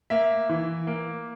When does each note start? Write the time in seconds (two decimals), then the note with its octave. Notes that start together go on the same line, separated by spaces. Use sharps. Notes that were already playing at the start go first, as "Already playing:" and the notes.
0.10 A#3 E5
0.49 E3
0.87 A#3